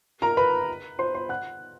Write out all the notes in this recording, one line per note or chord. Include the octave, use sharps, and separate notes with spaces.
A#4 A#5
B4 B5
C5 C6
C5 C6
F#5 F#6